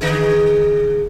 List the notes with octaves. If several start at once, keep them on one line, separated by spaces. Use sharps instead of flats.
D3 D#4 G#4